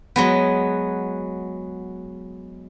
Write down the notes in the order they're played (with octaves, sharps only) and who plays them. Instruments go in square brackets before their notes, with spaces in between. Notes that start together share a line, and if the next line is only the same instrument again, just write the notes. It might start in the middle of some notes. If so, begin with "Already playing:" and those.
[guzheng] F#3 G#3 B3